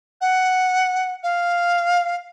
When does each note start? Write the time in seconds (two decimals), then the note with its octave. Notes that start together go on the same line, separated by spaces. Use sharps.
0.21 F#5
1.23 F5